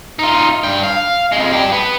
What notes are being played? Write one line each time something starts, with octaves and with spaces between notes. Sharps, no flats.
D#4 F4
G2 G5
F5
F2 G#3
D4 G4
B3